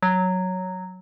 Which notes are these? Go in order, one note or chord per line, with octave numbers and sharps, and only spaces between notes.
F#3